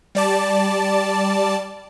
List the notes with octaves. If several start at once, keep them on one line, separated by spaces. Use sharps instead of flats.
G3 D5 A5